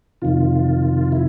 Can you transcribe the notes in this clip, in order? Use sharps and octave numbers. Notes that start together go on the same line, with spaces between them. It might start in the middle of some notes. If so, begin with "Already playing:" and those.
F2 C3 D#3 F4
E4